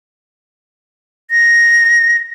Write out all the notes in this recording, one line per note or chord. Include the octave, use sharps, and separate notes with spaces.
A#6